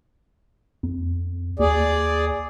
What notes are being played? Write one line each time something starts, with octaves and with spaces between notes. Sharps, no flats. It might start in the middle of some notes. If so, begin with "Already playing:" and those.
F2
D#2 G#4 D5